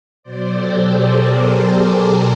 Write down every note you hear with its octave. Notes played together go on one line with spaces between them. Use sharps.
B2 F#3 C5 D5
G4 A4
G#4
G#4 A#4
A#4 C5
G#4 A#4